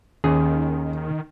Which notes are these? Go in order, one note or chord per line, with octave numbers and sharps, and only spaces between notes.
D#2 D#3 C#4 G#4